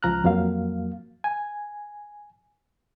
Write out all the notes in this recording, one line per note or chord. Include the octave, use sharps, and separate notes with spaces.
C#2 F3 A#5 F6 F#6
F2 F#3 A#3 F5
G#5